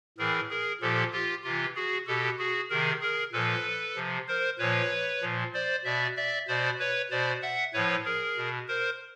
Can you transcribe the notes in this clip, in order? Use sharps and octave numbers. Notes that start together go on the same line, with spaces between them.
A2 E3 G#4 A#4
G#4 A#4
A#2 F3 G4 A4
F4 G4
C3 E3 F4 G4
F#4 G#4
B2 G4 A4
F#4 G#4
C3 D#3 G#4 A#4
G#4 A#4
A#2 F3 A4 B4
C3 F3
A#4 C5
A#2 F3 B4 C#5
A#2 F3
C5 D5
B2 D5 E5
D5 E5
B2 C5 D5
B4 C#5
B2 C5 D5
E5 F#5
A2 F3 B4 C#5
G#4 A#4
B2
A#4 C5